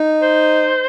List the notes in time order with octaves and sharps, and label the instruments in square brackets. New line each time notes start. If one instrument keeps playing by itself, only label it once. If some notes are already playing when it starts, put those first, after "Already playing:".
Already playing: [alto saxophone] D#4
[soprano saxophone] C5